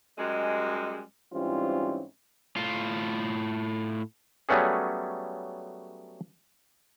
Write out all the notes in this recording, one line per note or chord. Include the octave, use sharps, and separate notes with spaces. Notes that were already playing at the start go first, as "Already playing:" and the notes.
F#2 G3 G#3
G#2 E3 G3 C4 C#4 F4
A2 F4
F#3 G3 A3 B3 C#4 G#4